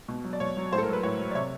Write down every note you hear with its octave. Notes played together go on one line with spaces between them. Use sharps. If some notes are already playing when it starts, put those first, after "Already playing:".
B2
F#3
D5
B2 C#5
F#3
A2 C5
A4
A#4
F#3 B4
A2 C#5
F#3
D5
C3 C#5